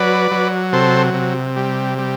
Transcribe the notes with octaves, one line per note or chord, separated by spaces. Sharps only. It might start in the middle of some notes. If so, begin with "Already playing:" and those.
Already playing: F#3 B4 D5
F#3
C3 A4 C5
C3
G3
G3